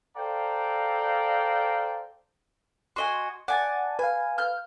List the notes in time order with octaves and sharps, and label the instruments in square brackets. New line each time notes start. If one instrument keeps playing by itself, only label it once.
[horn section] A4 C5 D5 F5 G5 A#5
[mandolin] F#4 D#5 G#5 [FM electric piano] C6
[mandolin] D5 G#5 A5 [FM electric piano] F#5
[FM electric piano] B4 F5 [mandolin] G#5
[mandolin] F6 G6